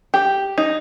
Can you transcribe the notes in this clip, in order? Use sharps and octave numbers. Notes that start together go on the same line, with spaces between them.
G4
D#4